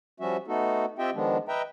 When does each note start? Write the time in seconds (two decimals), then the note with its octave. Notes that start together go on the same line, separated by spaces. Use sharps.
0.20 F3 G3 C#4 F#4 E5
0.47 A3 B3 D#4 F#4 A4
0.99 C4 F4 G4 D#5 E5 G5
1.14 D#3 F3 G#3 B3 D4
1.48 B4 D#5 E5 G5 A#5